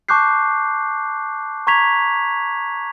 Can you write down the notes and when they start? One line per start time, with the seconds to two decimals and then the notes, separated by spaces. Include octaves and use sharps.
0.09 A5 C#6 D6 F#6 G6 C7
1.67 A#5 C#6 G#6 B6 F7